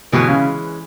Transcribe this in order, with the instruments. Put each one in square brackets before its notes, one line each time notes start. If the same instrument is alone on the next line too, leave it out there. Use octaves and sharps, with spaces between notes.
[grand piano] B2 [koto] E3 G#3 C#4 G#4 B4
[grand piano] C#3